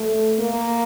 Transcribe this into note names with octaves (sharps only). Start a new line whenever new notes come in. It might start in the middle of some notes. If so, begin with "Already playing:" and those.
Already playing: A3
A#3